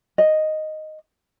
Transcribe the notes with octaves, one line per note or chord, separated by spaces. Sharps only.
D#5